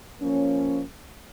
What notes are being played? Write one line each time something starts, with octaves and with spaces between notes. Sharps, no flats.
F3 A#3 C#4